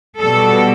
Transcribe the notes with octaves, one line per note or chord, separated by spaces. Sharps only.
B2 G3 A4